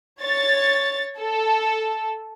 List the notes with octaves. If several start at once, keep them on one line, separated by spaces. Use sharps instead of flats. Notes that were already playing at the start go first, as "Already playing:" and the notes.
C#5 A6
A4